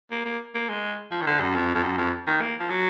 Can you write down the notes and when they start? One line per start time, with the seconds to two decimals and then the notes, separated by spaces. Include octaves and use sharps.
0.11 A#3
0.25 A#3
0.55 A#3
0.69 G#3
1.11 F3
1.21 D#3
1.27 D3
1.40 F#2
1.54 F2
1.75 F2
1.83 F#2
1.98 F2
2.27 D#3
2.41 A#3
2.60 F3
2.70 F#3